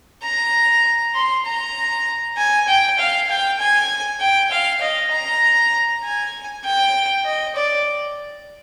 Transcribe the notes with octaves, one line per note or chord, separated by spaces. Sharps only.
A#5
C6
A#5
G#5
G5
F5
G5
G#5
G5
F5
D#5
A#5
G#5
G5
D#5
D5